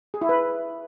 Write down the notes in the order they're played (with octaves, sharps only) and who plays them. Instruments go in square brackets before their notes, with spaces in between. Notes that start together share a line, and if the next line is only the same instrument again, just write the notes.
[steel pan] G#4
E4
B4